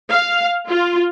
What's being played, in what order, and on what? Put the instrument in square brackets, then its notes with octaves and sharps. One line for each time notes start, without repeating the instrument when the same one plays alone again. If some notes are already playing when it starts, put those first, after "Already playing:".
[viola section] F5
F4